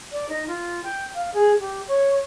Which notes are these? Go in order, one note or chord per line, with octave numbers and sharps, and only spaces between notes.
D5
D#4
F4
G5
F5
G#4
G4
C#5